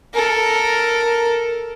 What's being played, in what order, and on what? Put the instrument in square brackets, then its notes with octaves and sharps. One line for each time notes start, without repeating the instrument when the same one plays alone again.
[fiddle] A4 A#4